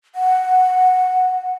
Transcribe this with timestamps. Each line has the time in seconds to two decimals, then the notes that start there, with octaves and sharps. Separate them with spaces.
0.15 F#5